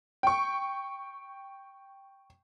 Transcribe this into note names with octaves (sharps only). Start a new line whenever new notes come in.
G5 C#6